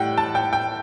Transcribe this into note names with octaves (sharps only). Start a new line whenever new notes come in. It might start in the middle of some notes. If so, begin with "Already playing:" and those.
Already playing: A2 G3 F#5 G5
A5
G5
G5